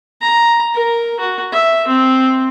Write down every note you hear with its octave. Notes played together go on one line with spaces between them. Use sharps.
A#5
A#4
F#4
E5
C4